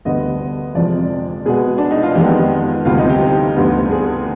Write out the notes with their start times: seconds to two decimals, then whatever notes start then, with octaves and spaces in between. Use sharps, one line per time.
0.05 D2 D3 G3 B3 D#5
0.75 F2 C3 F3 G#3 D5
1.45 B2 G#3 B3 G#4
1.78 D4
1.91 D#4
2.03 F4
2.15 F2 D#3 G#3 B3 G4
2.85 D2 C3 G3 B3 F4
2.98 D#4
3.09 G4
3.56 D2 D3 G3 B3
3.91 G#4